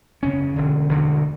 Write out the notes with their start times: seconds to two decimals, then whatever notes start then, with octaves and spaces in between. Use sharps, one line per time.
0.22 F#1 E2 C#3 C#4
0.56 E1 D2 D3
0.89 E1 D2 D3